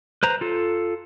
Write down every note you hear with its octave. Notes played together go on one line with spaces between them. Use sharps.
B4 C5 A#5
F4 A4